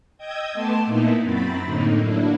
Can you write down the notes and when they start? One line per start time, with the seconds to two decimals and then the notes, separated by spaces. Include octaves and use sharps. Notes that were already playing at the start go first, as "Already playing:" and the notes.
0.18 D#5 G5 D#6 E6 G6 G#6
0.53 A3 B3 A5 C6 D6
0.86 A#2 A#3 B3 D#4 E4
1.23 F#2 F#3 C4 B5 A6
1.64 A2 D3 A#3 D#4
1.97 F#3 A#3 D4 E4